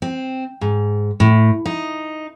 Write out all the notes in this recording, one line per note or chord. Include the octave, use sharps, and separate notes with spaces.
C4
G#2
A2
D#4